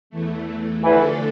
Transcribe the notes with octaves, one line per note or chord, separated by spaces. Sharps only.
E2 E3 A3
E2 D3 E3 F3 A3 D4 A4